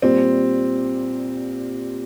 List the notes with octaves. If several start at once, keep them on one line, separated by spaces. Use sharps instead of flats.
A#2 G3 C4